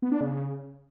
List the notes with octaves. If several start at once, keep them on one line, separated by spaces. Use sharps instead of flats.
B3
D4
C#3